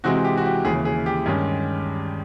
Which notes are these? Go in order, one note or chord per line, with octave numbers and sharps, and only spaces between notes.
C3 E3 G#3 C4 F#4
G4
F#4
G4
D#2 C#3 E3 G#4
G#4
G4
G2 D#3 G#3 C#4